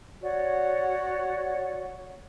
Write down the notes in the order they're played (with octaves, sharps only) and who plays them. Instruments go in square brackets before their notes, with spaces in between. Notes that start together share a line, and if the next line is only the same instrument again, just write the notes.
[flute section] F#4 C#5 D5 F#5